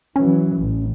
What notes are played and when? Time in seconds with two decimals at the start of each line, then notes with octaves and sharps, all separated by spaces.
0.16 E3 F#3 C#4
0.55 A1